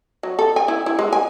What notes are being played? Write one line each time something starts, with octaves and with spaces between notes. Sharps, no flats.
F#3
A4
G#5
E4
E4
G#3
G#5